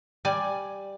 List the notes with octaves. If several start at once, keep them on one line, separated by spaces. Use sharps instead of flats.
G3 D5 G#5